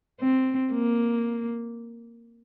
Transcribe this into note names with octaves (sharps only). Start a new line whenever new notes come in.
C4
A#3